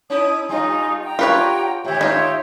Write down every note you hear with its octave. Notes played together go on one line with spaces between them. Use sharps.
C#4 D#4 E4 D#6
G2 G3 D#4 F4
F#5 G5 A#5
D4 F4 G4 B4 C#5
G#2 D#3 G4 C#5 E5
D#4 F4